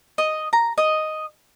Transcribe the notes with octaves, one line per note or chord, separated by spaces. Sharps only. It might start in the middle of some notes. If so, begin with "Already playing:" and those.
D#5
A#5
D#5